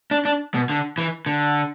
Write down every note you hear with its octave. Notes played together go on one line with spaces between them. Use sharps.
D4
D4
B2
D3
E3
D3